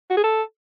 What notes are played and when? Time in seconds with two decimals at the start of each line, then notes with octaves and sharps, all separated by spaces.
0.10 F#4
0.17 G#4
0.24 A4